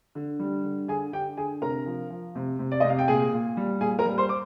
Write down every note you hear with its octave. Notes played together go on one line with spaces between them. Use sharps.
D3
G3
D3
D3 G#4 G#5
D3 G4 G5
D3 G#4 G#5
C3 A#4 A#5
F3
F3
C3
C3
D5
C3 D#5
F5
G5
A#2 G#4 G#5
A#2
G3
A#2 G#4 G#5
A#4 A#5
G3
C5 C6
D6